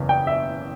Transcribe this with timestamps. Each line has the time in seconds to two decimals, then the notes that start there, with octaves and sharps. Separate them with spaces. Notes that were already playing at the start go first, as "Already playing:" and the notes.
Already playing: F#1 E2 C#3 E3
0.09 G5
0.27 E5